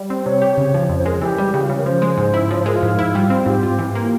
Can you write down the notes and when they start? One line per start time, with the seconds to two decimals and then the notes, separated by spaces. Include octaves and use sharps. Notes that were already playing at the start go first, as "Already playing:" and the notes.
Already playing: G3
0.10 C4
0.25 C3 C#5
0.42 G4
0.58 C#3
0.74 F3
0.89 F2
0.98 C5
1.06 G#3 A#4
1.14 G#4
1.21 E3 G4
1.38 G3
1.54 C#3 G4
1.62 F4
1.69 C#3 G4
1.78 A#4
1.86 F3 C5
2.02 G#3
2.18 G#2
2.34 E4
2.51 F3 C#5
2.58 C5
2.66 G#3 A#4
2.74 F4
2.83 G#2
2.99 E4
3.15 G3
3.30 C4
3.46 G#2 G4
3.63 F4
3.79 E3
3.95 A#3